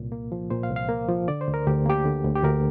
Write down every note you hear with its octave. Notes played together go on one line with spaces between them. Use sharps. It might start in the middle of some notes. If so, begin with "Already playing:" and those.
Already playing: C2 A#2
A#3
F3
A#2 C5
F5
C2
F5
A#3
F3
D3 D5
C5
D2
A#4
D2 G4
A#3 G4
D3
D2
G4
D2 A#4